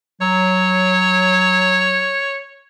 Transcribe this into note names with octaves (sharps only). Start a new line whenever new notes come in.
F#3 C#5